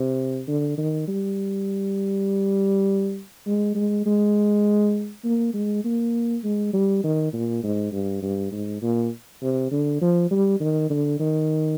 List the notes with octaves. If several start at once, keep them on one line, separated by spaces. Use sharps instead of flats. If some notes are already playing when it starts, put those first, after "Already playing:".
Already playing: C3
D3
D#3
G3
G#3
G#3
G#3
A#3
G#3
A#3
G#3
G3
D#3
A#2
G#2
G2
G2
G#2
A#2
C3
D3
F3
G3
D#3
D3
D#3